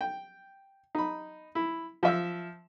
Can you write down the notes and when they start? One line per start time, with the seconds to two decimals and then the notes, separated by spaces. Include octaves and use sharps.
0.01 G5
0.95 D#4 B5
1.55 E4
2.03 F3 E5 E6